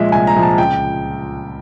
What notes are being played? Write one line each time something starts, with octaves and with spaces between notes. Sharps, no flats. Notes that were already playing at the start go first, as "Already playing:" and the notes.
Already playing: A#2 F3 G#3 E5
C2 G#5
A#5
A#2 F3 G#3
A5
C#2 G5